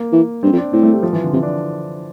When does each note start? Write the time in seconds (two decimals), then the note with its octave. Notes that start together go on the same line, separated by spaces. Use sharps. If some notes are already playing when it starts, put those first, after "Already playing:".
Already playing: A#3
0.12 E3
0.43 G2 C4
0.53 F2
0.57 D4
0.73 A2 C4
0.83 A3
0.94 G3
1.03 F3
1.13 E3
1.24 D3
1.33 C3 E3
1.43 D4